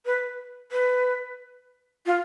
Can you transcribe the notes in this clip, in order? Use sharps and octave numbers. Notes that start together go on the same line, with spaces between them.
B4
B4
F4